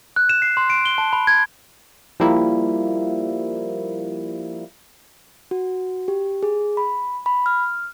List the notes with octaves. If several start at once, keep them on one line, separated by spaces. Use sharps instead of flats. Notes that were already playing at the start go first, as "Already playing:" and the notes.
F#6
E7
C7
C6
D7
G7
A5
B5
G#6
F3 G3 A#3 E4
F#4
G4
G#4
B5
B5
F6